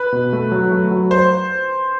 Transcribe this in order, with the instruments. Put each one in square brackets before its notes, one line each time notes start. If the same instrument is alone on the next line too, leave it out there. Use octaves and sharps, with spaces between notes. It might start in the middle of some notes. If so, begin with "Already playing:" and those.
Already playing: [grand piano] B4
[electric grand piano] B2
A3
F#3
A3
F#3
[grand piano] C5